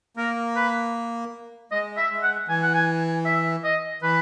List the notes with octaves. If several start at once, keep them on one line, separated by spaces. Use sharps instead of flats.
A#3 A#4
B4
G#3 D#5
E5
G#3
F#5
E3 G#5
F#5
G#5
E5
D#5
E3 B4